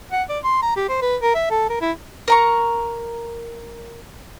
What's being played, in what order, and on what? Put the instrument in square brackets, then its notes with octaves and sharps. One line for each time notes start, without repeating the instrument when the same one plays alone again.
[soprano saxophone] F#5
D5
C6
A#5
G4
C5
B4
A#4
E5
A4
A#4
E4
[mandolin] A#4 A#5 C#6